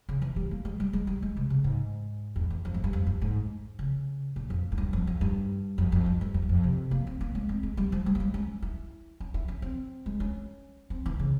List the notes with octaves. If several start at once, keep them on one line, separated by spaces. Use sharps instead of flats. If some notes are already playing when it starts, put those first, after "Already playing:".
C#3
E3
G3
A#3
G#3
G3
G#3
G3
G#3
C3
C#3
G#2
E2
E2
F2
G#2
G2
F2
G2
G#2
C#3
A#2
F2
G#2
G2
F2
F2
G2
F2
F2
G2
G2
F2
E2
F2
C3
A#3
C4
A#3
G#3
C4
G#3
G3
F3
G3
A#3
G#3
C#4
E4
C#4
E4
C#4
C4
G#3
C#4
C4
E3
C#3